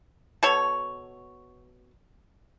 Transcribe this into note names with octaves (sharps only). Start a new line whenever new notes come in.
B2 A4 C#5